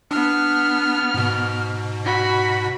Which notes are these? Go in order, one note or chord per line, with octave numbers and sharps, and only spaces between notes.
B3 D4 F6
G#2 B2
F#4 B5